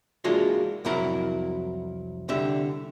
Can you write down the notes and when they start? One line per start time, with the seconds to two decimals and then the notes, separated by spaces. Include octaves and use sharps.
0.24 E3 G#3 A#3 D4 F4 F#4
0.85 C2 F2 F#3 E4 A#4 F#5
2.29 C2 D3 G4 E5